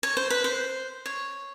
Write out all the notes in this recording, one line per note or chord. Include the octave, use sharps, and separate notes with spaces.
C#5
C5
B4
C5
C#5